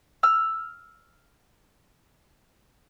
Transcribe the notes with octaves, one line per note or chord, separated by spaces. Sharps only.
E6 F6